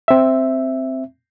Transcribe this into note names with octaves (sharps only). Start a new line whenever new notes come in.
C4 E5